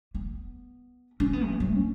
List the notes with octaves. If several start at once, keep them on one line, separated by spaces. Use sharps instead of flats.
B3
C#4
B3
E3
F#3
C#4